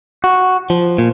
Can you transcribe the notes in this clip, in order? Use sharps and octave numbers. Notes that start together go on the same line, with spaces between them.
F#4
F3
A#2